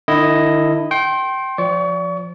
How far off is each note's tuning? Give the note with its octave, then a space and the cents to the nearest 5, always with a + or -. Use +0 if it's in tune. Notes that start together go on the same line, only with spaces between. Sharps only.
D#3 -45 E4 +0 D#5 +0
G5 -20 C6 +25
F3 +0 D5 -30 C#6 +30